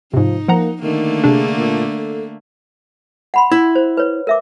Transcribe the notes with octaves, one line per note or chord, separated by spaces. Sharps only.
G#2 C3 F3 D#4
F3 A#3 F#5 A#5
D3 D#3 A3 A#3
C3 D4 G#4
A#2
A4
F#5 B5 C6
E4
C5
B4 C#5
A#4 E5 D6